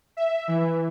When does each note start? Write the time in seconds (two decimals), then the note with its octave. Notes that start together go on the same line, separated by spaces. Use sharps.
0.17 E5
0.48 E3